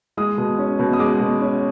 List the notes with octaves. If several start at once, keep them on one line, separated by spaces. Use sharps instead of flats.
G#3 D#6
B2
C#4
B2
D#6
G#3 D6
B2
C#4